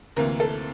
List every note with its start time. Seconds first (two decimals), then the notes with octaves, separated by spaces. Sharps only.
0.16 D2 C3 E3 A#3 A#4
0.40 A4